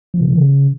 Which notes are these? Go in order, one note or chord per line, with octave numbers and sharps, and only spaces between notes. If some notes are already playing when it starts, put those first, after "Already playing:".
F3
C3
E3
C#3